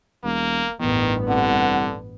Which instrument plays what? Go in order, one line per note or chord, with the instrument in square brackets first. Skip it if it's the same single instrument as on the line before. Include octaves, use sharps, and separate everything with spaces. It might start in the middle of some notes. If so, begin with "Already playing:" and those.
[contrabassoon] E1 [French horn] A#3
[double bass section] A1 G2 B3 [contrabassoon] E2 [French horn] D#3
[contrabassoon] C2 [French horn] D3 [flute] F#5